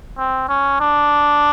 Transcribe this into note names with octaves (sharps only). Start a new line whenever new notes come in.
C4
C#4
D4